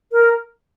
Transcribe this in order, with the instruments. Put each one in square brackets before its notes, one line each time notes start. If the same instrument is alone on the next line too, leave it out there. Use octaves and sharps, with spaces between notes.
[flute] A#4